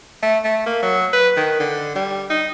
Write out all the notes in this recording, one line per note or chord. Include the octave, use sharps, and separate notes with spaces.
A3
A3
A#3
F#3
B4
D#3
D3
G3
D#4